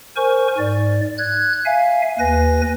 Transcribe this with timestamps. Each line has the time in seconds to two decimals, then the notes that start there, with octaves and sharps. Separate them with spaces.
0.16 A#4 C5 G#5 C#6
0.58 G#2 D5
1.18 F#6 G#6
1.65 E5 F5 G#5
2.19 D#2 B4 G#5 A#6